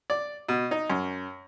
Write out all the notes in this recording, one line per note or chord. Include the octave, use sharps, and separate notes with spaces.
D5
B2
D#4
F#2